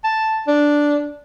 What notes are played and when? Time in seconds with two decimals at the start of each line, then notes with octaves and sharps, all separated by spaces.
0.04 A5
0.47 D4